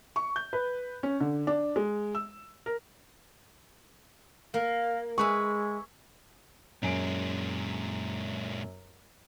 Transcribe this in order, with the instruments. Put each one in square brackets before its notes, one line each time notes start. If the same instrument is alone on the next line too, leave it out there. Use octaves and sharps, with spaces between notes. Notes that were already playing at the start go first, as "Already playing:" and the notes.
[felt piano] C#6
G6
B4
C#4
D3
D4
G#3
E6
A#4
[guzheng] A#3 [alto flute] F5
[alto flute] G#3 [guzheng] G#4 B4 E5 [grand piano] C#6
[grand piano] F#2 G#5 D7 [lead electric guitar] A#2 G#3